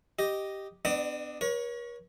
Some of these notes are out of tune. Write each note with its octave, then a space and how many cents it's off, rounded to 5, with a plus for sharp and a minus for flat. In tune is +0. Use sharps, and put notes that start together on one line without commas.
G4 -5 D#5 +0
B3 +35 D4 +15 D#5 -45
A#4 +45 C#5 +0